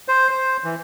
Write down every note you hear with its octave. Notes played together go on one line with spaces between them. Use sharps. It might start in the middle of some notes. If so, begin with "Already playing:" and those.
C5
C5
E3